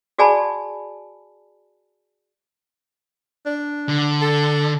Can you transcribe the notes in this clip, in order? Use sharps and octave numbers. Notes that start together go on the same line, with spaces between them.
F#4 G#4 D5 G#5 A5 B5
D4
D3
A4